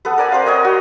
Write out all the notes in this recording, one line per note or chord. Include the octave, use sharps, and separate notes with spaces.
B3 A4 B4
A#4 D5 G#5 B5
C4 A#4 C5 F5
C#5 D#5 G#5
F#4